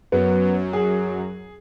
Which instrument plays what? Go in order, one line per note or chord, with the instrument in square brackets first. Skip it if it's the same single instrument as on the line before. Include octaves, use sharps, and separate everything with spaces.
[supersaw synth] F#2 F#3 [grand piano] B3
[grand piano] G#4